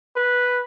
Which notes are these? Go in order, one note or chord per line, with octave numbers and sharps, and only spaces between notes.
B4